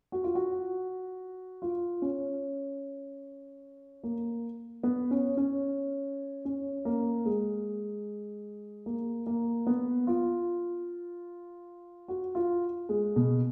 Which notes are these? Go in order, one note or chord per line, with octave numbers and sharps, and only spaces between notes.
F#4
F4
F#4
F4
C#4
A#3
B3
C#4
C#4
C#4
A#3
G#3
A#3
A#3
B3
F4
F#4
F4
G#3
B2